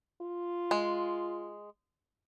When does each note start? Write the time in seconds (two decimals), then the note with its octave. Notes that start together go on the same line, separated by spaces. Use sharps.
0.22 F4
0.71 G#3